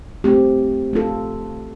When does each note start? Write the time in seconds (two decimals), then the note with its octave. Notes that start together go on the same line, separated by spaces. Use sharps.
0.24 A3 C4 G4
0.93 A3 F4 A4